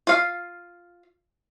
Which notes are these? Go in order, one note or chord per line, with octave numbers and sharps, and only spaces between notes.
F4 F5